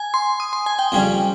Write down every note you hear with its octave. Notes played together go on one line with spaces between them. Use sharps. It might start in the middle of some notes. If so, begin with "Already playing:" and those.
Already playing: G#5
C6
D#6
C6
G#5
G5
F2 C#3 G3 C#4